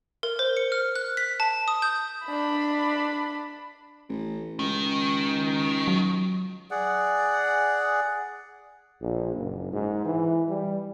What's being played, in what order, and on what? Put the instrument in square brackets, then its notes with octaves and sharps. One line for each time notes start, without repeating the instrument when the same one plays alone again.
[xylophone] A#4
C5
C#7
F6
F#6
B6
A5
D#6
G6
[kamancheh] D4 B5
[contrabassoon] A1
[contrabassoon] C#2 [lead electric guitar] D#3
[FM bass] F#3
[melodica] G#4 D5 F#5
[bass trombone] A#1
F#1
G#2
E3
G3